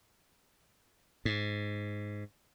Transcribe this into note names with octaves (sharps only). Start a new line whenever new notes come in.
G#2